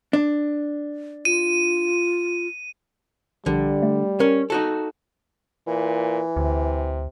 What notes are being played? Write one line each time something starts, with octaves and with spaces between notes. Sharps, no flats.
D4
F4 D#7
A#1 D3 G3
A3
C#4 A#4
D#4 F#4 A4
A#2 E3
D2 C3